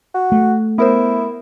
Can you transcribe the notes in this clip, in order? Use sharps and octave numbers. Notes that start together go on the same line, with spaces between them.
F#4
A3
B3 E4 A#4 C5